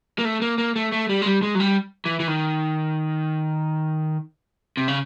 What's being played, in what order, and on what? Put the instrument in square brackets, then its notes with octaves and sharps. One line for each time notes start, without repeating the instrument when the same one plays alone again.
[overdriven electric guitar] A#3
A3
A#3
A#3
A3
A3
G3
G#3
G3
G#3
F#3
G3
E3
E3
D#3
C3
C#3